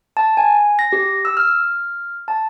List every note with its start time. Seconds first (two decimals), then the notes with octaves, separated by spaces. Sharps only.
0.17 A5
0.37 G#5
0.79 A#6
0.93 G4
1.25 E6
1.37 F6
2.28 A5